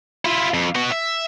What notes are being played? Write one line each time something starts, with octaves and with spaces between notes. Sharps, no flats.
E4 F4
F2
B3 F#4
E5